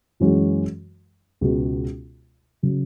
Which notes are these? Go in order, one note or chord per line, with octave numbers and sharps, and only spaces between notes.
F#2 E3 G#3 C#4 F#4
C#2 B2 G#3 B3 F#4
C#3 F#3